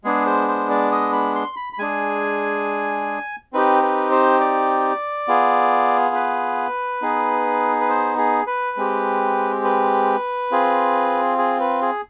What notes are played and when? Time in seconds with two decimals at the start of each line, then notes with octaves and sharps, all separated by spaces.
0.04 G#3 B3 D4 G#4
0.26 C5
0.48 C5
0.70 D5
0.92 D#5
1.13 B5
1.35 C6
1.56 B5
1.73 B5
1.78 G#3 D4 G#4 G#5
3.53 C4 D#4 G4 B4
3.83 B4
4.11 C5
4.40 D5
5.28 B3 F4 G#4
6.15 B4
7.02 B3 D#4 G#4
7.81 B4
7.89 C5
8.18 G#4
8.47 B4
8.77 G#3 C4 G4
9.64 B4
10.51 C4 F4 G#4
11.38 G#4
11.60 B4
11.82 G#4